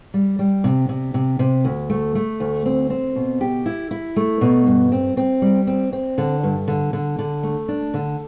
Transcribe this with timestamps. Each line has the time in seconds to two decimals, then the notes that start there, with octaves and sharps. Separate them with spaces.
0.14 G3
0.39 G3
0.64 C3
0.89 C3
1.14 C3
1.39 C3
1.65 D2
1.90 A3
2.15 A3
2.40 D2
2.66 C4
2.90 C4
3.16 B2
3.41 G4
3.66 E4
3.91 E4
4.16 A3
4.41 B2
4.67 G2
4.92 C4
5.17 C4
5.42 G3
5.67 C4
5.93 C4
6.18 D3
6.43 G2
6.68 D3
6.93 D3
7.19 D3
7.43 A3
7.68 D4
7.94 D3